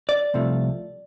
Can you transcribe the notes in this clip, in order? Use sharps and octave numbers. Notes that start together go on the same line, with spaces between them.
D5
C2 C3 F3 A3